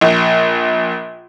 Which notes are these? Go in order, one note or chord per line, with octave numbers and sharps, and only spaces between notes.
A#1